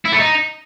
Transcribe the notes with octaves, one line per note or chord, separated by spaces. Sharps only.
E4
A3
D#4